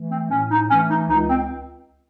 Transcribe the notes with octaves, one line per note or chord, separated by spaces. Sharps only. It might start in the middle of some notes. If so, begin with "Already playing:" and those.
Already playing: E3 A3
C4
A2 C#4
D#4
E3 A3 C#4
D#4
C#2 D#4
C4